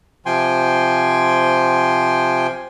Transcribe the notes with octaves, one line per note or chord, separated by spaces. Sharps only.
C3 F3 G5 G#5 C6